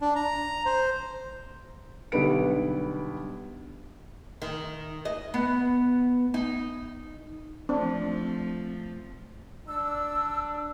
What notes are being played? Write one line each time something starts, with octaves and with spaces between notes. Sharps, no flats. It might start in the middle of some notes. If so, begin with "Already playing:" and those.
D4
A#5
C5
B1 D3 G3 B4 D7
D#3
D#5
B3
D#4
F3 A3 C4 D4
D4 E6